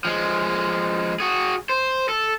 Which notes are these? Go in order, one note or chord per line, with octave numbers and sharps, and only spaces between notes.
F3 G#3
F#4 G#4
C5
A4